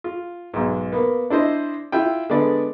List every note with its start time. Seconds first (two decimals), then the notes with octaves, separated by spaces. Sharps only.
0.04 F4
0.54 B1 G#2
0.92 A#3 B3
1.30 D4 E4 C5 D#5
1.92 E4 F4 G5
2.30 D3 G#3 B3 D5